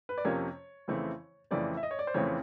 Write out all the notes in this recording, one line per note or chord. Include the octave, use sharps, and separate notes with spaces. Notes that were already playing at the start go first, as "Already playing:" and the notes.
B4
D5
F2 C3 F3 A#3 C#4 C#5
F2 C#3 E3 A3 C4
F2 C#3 E3 A3 C4 D5
E5
D#5
C#5
D5
C5
F2 C#3 E3 A3 C4 C#5